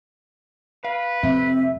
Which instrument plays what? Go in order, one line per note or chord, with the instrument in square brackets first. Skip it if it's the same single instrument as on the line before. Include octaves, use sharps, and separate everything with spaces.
[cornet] B4 [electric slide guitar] F5
[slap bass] F2 C3 A3 [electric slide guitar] C4 [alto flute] E5